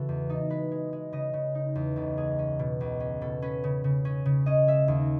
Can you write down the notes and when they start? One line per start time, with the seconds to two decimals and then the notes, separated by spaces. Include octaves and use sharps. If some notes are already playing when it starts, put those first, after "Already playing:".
Already playing: C#3 E3 F#4 A4
0.09 E2
0.30 D#4 A4
0.50 G#3 B4
0.71 G#3
0.93 G#3
1.13 C#3 D#5
1.33 C#3
1.55 D#4
1.75 E2
1.96 C#2 A4
2.17 G#3 G#4
2.39 C#4
2.59 B2
2.81 C#2
3.00 C#4
3.21 B2 A4
3.42 C#4 B4
3.64 C#3
3.84 C#3
4.05 C#4
4.26 C#3
4.46 C#4 D#5
4.68 G#3 E5
4.88 D#2